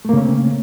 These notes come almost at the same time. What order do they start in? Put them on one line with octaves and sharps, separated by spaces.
A3 A#3 C#3 C#4 C4